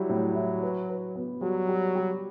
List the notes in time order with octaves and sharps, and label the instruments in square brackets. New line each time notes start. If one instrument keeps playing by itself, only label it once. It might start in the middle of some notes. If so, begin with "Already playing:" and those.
Already playing: [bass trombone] F#3 [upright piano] G3 E4
[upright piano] A2
E4
B4
B4
B3
[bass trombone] F#3 [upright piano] G3
[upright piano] G3
G3